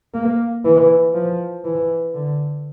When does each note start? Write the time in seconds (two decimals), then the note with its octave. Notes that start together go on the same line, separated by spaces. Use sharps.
0.14 A#3
0.65 E3
1.14 F3
1.65 E3
2.14 D3